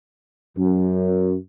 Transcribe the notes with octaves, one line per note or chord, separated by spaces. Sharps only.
F#2